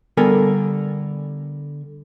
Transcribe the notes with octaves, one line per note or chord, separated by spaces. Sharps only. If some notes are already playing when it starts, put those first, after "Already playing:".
D3 G3 B3 A4 A#4 G#5